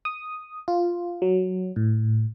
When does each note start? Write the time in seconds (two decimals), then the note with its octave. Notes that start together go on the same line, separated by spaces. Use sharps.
0.05 D#6
0.68 F4
1.22 F#3
1.76 A2